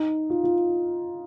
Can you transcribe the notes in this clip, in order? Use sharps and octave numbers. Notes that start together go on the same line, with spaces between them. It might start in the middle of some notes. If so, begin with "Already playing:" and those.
Already playing: D#4
F4
F4